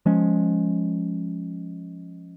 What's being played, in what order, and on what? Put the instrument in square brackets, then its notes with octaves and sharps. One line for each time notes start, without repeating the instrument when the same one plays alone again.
[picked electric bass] F3 G#3 C#4